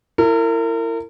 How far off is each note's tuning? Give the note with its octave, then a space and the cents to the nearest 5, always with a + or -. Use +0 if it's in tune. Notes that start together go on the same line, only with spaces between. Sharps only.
E4 +20 A#4 -35